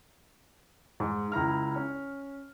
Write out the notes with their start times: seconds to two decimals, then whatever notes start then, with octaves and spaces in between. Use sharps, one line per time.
1.00 G#2
1.32 C#2 E4 A#5 F6
1.76 C#4